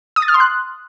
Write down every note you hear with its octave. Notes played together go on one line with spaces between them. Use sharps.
D#6
A6
F6
C6
F#6